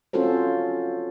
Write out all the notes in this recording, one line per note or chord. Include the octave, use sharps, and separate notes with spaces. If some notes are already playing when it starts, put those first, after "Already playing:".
C4 C#4 F4 F#4 A4 C5